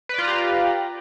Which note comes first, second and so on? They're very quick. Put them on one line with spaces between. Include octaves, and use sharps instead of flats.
B4 D5 F4 A#5 G4